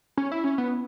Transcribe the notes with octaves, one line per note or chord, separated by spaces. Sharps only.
C#4
E4
C#4
B3